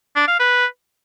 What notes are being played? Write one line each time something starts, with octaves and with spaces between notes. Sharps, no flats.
D4
F5
B4